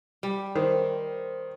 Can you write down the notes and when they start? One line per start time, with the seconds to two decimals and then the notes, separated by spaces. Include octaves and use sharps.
0.23 G3
0.55 D#3 C5